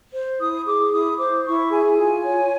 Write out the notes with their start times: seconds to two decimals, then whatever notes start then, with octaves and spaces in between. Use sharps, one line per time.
0.12 C5
0.39 E4 D#6
0.66 G#4 D6
0.91 E4 D#6
1.18 C5 D6
1.45 E4 C#6
1.71 G#4 G#5
1.97 F4 G#5
2.24 C#5